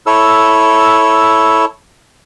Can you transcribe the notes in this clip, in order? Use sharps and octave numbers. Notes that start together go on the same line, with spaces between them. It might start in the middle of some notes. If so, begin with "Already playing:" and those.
E4 A4 C#5 E6